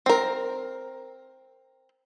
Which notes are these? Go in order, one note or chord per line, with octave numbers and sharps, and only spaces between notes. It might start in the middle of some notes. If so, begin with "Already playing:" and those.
C4 A#4